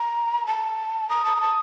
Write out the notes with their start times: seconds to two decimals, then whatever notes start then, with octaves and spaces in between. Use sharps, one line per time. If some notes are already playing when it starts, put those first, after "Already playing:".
Already playing: A#5
0.47 A5
1.09 A#5 D#6
1.25 A5
1.36 A#5
1.41 A5